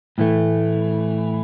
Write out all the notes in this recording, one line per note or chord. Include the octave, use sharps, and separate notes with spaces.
A2 E3 A3